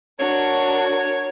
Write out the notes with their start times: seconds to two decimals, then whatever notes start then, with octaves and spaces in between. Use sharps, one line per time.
0.19 D4 F#4 A#4 C#5